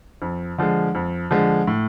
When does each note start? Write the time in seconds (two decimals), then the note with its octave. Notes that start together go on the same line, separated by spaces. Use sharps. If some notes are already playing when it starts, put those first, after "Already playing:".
0.22 F2
0.58 D3 F3 G#3
0.95 F2
1.31 D3 F3 G#3
1.67 A2